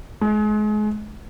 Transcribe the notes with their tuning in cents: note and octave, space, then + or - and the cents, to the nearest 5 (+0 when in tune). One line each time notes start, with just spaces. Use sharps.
G#3 +35